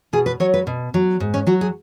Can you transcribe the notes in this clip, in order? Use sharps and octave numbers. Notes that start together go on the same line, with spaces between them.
B2 G#4
B4
F#3 C#5
B4
B2
F#3
G#2
C#4
F#3 F#4
G#4